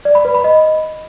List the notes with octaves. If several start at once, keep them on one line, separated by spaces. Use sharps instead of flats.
D5
B5
B4
B5
D#5